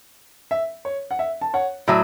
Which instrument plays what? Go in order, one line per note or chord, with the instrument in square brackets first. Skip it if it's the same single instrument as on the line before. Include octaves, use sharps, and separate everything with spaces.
[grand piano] E5
C#5
F#5
E5
A5
C#5 F#5
[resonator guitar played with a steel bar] A2 F#3 [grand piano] E5